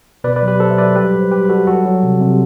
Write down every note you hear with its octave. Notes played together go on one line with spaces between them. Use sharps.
B2 B4 D5
B4 D5
F#3
G4 B4
F#3 A4 C5
E5
F#3 B4 D5
G3 G4 B4
A2
C5
G3 G4 B4
B4
G3 F#4 A4
F#3 F#4 A4
F#3
C3
C3